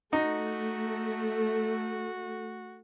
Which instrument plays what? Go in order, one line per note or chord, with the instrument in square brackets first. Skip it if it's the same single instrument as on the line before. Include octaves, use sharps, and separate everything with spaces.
[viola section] A3 [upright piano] D#4 [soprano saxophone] F#4